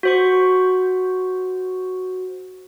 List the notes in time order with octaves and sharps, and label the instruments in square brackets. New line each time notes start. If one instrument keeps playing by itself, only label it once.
[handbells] F#4 C5 C#6